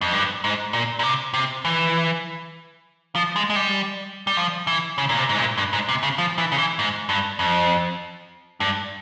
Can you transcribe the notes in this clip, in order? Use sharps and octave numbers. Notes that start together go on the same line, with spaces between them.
F2
G2
G#2
A#2
A#2
C3
C3
E3
F3
G#3
G#3
G3
G3
F3
E3
C#3
A#2
C3
G#2
A#2
G2
G#2
C3
C#3
F3
E3
C#3
E3
G#2
G2
F2
G2